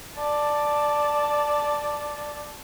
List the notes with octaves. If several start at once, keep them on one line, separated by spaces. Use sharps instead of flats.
D5 A5